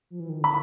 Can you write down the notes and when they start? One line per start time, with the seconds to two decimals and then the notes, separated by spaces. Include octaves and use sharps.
0.10 F3
0.20 E3
0.29 D#3
0.41 D3 B5